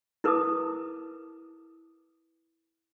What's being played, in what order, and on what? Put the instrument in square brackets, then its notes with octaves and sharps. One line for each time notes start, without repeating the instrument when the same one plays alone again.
[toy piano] E4 A#4 B4 A5 D6 D#6